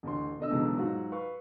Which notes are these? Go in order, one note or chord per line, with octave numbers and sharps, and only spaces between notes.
A1 D2 C6
B2 D3 D#5 E6
B1 E2 B2 D3 F#3 G#3
G#2 F#3 F4 F#4
B4 F5 C#6